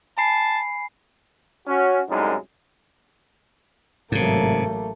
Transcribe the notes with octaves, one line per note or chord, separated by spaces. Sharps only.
G#5 A5 B5 C7
C#4 F#4
C2 F#2 A2 G#3 D#4
A1 G#2 C3 F#3 A3 A#3